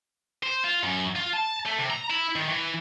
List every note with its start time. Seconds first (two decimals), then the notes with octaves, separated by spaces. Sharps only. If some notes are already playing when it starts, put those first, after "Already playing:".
0.43 C5
0.64 F4
0.83 F#2
1.16 F4
1.34 A5
1.66 A3
1.79 C3
1.91 A#5
2.10 E4
2.36 D#3
2.49 E3